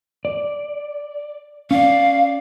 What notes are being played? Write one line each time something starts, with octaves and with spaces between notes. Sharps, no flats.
D5
C#4 D5 F5